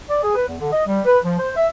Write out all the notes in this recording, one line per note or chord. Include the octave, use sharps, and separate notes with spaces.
D5
G#4
B4
E2
D3
D#5
G3
B4
F3
C5
E5